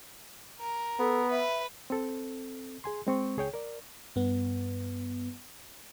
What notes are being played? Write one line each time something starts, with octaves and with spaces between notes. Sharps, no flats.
A#4
B3 A4
B4 E5
C4 A4
G#4 G#5 C6
G#3 C4 C#6
C#2 G#4 C#5 G5
A#4 D5
G2 B3